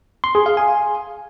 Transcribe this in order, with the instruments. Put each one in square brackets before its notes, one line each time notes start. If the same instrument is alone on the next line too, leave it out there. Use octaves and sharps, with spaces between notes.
[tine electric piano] C6
G#4
F5
G#5